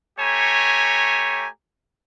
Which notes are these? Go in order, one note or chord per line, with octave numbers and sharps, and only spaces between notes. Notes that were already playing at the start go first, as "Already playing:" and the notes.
A3 G4 C#5 G#5 A#5